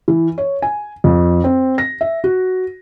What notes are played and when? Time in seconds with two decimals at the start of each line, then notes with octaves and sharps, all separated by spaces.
0.08 E3
0.38 C#5
0.62 G#5
1.04 F2
1.44 C4
1.78 A#6
2.01 E5
2.24 F#4